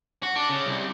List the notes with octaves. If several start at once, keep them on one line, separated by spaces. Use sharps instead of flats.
F#4
D4
C#3
C2